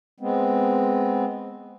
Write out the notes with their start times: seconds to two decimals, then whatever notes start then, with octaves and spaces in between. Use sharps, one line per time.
0.20 G#3 B3 C4